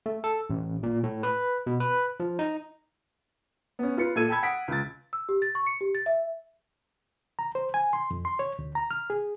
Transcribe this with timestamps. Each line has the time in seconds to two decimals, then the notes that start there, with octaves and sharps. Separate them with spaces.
0.06 A3
0.24 A4
0.50 A1
0.83 A#2
1.04 A2
1.23 B4
1.67 B2
1.80 B4
2.20 F3
2.39 D#4
3.79 B3 C#4
3.97 F4 B4 C#7
4.16 A#2 A4 E6 G#6 D#7
4.29 G5 A5 B5 E6 G#6
4.43 F#5 D#6 B6 D7
4.68 C#2 A6
5.13 E6
5.29 G4
5.42 A6
5.55 C#6
5.67 C#7
5.81 G4
5.95 A6
6.06 E5
7.39 A#5
7.55 C5
7.74 G#5
7.93 C6
8.11 F2
8.25 C6
8.39 C#5
8.59 D2
8.75 A#5
8.91 F6
9.10 G#4